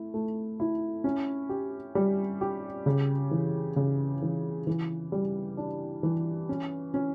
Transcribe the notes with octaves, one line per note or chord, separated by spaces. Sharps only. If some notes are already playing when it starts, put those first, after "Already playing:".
Already playing: A3 E4
A3
E4
C#4
G4
G3
G4
C#3
E3
C#3
E3
E3
G3
D4
E3
C#4
C#4